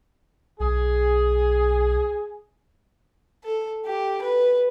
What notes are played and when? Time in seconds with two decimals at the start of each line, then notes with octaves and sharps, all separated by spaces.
0.60 B1 G#4
3.44 A4
3.85 G4
4.22 B4